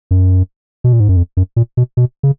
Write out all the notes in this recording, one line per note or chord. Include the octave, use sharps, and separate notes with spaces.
F#2
B2
A#2
G#2
F#2
F2
F#2
A#2
B2
B2
C#3